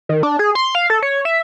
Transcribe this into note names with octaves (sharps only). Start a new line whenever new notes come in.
D#3
D4
G#4
C6
F5
A4
C#5
E5